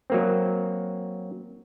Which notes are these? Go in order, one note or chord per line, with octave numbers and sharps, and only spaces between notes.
F#3 A#3 C4